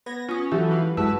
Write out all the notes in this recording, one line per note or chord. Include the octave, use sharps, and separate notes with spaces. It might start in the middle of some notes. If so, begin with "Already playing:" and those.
B3 G#6 A#6
C#4 F4 D#6
E3 F#3 E4 F#4 G4 A4
B4 F5
F#2 G#3 E4 F#4 B4 A5 E6